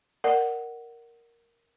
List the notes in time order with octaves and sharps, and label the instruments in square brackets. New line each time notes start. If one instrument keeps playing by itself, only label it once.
[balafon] A#4 D5 F#5